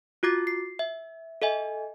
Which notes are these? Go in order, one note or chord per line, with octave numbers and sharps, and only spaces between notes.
F4 F#4 D6 A6
C7
E5
A4 D#5 E5 G#5